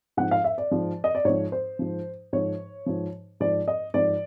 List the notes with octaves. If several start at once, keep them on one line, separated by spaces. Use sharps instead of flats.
G#2 F3 F#5
F5
E5
D5
G#2 F3
D#5
D5
G#2 F3 C#5
C5
G#2 F3
G#2 F3 C#5
G#2 F3
G#2 F3 D5
D#5
G#2 F3 D5